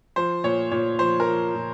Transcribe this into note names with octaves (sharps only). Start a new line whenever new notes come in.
F3 C5
A#2 C#5
A#2 C#5
F3 C5
A#4
F3
A#2